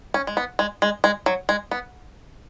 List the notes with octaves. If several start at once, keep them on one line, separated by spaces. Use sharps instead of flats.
C#4
G#3
B3
G#3
G#3
G#3
F#3
G#3
B3